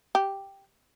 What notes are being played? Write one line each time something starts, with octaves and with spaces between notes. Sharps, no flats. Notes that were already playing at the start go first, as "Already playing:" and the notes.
G4